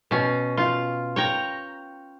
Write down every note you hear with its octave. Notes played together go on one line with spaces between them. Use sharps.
B2 C#4
F4
C#5 G5 A#5